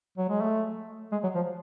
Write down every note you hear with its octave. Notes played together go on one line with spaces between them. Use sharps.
F#3
G#3
A3
G#3
F#3
F3